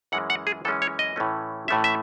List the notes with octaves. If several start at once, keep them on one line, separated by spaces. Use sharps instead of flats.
F#2 E3 G#3 C#4 F#5
F#5
G#4
F#2 E3 G#3 C#4 A4
C#5
D#5
A2 E3 A3 C#4
A2 E3 A3 C#4 E5
E5